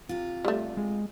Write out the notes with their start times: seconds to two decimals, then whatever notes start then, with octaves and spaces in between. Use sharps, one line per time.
0.09 C3 F4
0.45 G3 A3
0.77 G#3